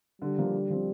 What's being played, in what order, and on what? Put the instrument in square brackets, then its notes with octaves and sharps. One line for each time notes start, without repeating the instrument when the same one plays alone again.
[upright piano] D3 [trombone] G3
[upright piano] F3 A#3
D3
F3 C4